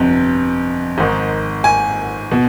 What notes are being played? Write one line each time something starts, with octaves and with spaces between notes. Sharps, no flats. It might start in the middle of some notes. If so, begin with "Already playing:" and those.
Already playing: G1 F2 C3
G#1 G#2 D#3
G#5
B2